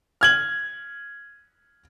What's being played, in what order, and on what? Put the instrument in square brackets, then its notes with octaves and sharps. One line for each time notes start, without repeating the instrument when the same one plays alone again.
[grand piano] F6 G#6 F#7